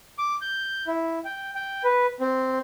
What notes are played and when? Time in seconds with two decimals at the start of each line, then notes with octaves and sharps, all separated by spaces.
0.18 D6
0.41 G6
0.87 E4
1.25 G5
1.55 G5
1.84 B4
2.20 C4